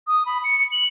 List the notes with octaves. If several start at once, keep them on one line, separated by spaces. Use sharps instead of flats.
D#6
B5
C#7
F#7